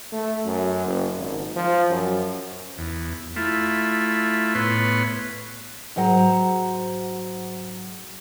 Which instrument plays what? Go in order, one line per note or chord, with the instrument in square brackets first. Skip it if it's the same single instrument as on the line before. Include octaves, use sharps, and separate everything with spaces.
[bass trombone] A3
F#2
F#1
G#1
F3
F#2
[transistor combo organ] E2
A3 E4 F4
A2 B3 B4 C#5 C6
[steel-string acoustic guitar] G#2 F#3 C5 F#5 A#5